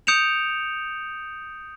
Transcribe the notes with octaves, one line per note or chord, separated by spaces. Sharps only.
D#6 G6 C#7 D7 E7 F7